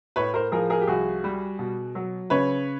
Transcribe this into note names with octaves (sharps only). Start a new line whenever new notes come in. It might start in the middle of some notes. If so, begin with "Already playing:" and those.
A2 B4 C#5
A#4 C5
F3 G#4 A#4
G#4 A#4
G4
C2 F#4 G#4
G3
B2
F#3
C#3 B4 C#5